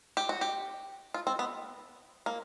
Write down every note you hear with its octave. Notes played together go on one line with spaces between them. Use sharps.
G4
F#4
G4
F4
C4
B3
A#3